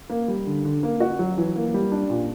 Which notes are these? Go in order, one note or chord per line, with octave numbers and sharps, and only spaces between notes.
A#3
G3
D3
D3
A#3
F#4
F#3
E3
A#3
G3
D4
A#2